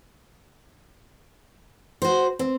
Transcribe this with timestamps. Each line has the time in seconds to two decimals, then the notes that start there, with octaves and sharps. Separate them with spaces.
2.02 F#4 C5
2.39 C4